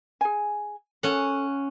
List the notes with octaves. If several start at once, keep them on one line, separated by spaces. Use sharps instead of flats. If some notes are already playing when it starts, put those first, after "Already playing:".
G#4 G#5
C#4 A4 F#5